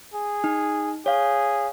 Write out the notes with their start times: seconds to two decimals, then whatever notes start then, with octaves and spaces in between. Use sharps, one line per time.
0.14 G#4
0.44 D#4
1.06 G#4 C#5 F5